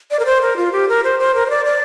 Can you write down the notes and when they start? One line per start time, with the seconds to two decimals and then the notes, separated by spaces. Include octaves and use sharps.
0.11 D5
0.19 A#4
0.26 C5
0.41 A#4
0.57 F4
0.72 G4
0.89 A#4
1.04 C5
1.19 C5
1.35 A#4
1.46 C5
1.50 D5
1.65 D5